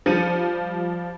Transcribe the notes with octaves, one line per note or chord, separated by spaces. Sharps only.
F3 G3 C#7 D#7